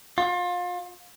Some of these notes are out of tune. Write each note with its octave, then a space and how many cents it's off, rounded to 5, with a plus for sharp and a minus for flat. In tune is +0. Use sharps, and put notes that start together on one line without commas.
F4 +30